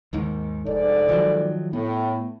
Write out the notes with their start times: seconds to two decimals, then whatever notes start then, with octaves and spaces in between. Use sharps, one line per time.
0.13 D#2 G#2 D#3
0.66 F1 G#2 A4 D5
1.09 D#3 F3 F#3
1.73 A2 B3